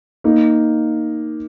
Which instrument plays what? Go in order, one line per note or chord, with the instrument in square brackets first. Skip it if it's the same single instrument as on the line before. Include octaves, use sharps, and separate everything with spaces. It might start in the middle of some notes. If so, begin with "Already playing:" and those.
[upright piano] A#3 D#4